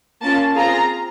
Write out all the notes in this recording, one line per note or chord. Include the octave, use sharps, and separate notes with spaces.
A#3 C#4 F4 A5
C4 F4 G#4 A#5